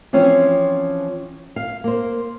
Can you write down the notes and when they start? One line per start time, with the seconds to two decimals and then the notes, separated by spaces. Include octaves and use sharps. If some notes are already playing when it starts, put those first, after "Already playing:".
0.13 E3 F3 C4 C#4 C#5
1.56 F5
1.84 A#3 C5